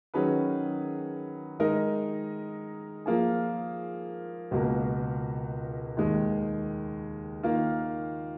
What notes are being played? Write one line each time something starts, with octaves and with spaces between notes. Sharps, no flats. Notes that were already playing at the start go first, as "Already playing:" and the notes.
D#3 F#3 C#4 G#4 B4
D#3 G#3 D#4 A#4
F3 A#3 F4 G#4
C#2 B2 A#3
D#2 D#3 G#3
D#3 A#3 F4